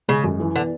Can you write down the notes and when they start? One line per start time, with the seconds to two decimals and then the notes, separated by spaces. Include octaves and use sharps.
0.08 C#3 G#3
0.24 F#2
0.40 E3
0.55 D3 B3